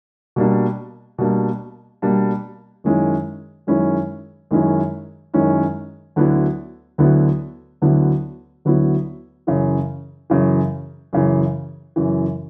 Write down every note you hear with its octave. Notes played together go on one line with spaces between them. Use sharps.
B2 G3 A#3 D4
B2 G3 A#3 D4
B2 G3 A#3 D4
F#2 D#3 G#3 C#4 E4
F#2 D#3 G#3 C#4 E4
F#2 D#3 G#3 C#4 E4
F#2 D#3 G#3 C#4 E4
D2 D3 F#3 B3 E4
D2 D3 F#3 B3 E4
D2 D3 F#3 B3 E4
D2 D3 F#3 B3 E4
F#2 C#3 E3
F#2 C#3 E3
F#2 C#3 E3
F#2 C#3 E3